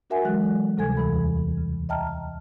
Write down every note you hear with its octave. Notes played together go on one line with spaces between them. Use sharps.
D4 F#4 A#4 E5 F#5 G#5
E3 F#3 G#3 A4 F#6
D2 C3 G3 A4 G#5 G#6
E2 E3 B5
C#3
D#5 E5 G5 A5 A#5 F6